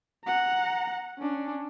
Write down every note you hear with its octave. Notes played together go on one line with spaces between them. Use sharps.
F#5 A#5
C#4 D4